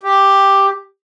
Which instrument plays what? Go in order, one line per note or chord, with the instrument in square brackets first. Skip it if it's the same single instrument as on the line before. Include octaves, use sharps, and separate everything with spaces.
[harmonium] G4